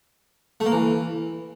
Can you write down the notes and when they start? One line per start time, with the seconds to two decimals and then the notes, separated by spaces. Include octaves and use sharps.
0.60 A3
0.66 A#3
0.72 E3